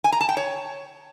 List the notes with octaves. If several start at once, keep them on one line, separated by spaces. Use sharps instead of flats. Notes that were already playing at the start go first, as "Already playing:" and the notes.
G#5
A#5
A5
G5
C#5